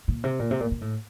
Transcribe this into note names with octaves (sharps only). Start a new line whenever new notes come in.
A#2
C3
A#2
C3
A#2
A#2
A2